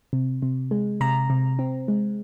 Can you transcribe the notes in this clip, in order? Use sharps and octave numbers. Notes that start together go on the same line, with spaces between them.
C3
C3
G#3
C3 A#5
C3
C4
G#3